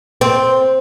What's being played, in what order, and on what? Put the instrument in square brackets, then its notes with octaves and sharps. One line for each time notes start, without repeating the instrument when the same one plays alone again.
[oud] C4